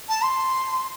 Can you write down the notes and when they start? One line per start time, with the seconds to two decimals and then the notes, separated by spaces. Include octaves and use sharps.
0.09 A5
0.23 C6